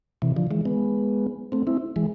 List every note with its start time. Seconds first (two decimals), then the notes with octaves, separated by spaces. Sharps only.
0.22 C3 E3
0.36 D3 F3
0.51 E3 G#3
0.65 G#3 B3
1.52 A3 C4
1.67 C4 E4
1.96 E3 G#3